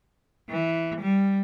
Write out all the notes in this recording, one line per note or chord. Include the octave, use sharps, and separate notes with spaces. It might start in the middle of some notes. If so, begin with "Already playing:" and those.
E3
G3